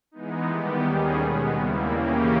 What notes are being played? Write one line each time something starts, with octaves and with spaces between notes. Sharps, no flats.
E3 G#3 B3 D#4
D#3 G3 B3 G4
D#2 D#3 G3 C#4 G#4
B2 G#3 B3
D#2 C#3 G3 A#3 E4
C#3 E3 A#3 C#4 G4